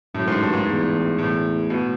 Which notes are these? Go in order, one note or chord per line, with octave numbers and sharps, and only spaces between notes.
F#2 A2
G#2
G2
G#2
E2
A2
B2